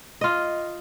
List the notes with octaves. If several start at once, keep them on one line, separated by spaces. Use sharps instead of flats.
F4 D#5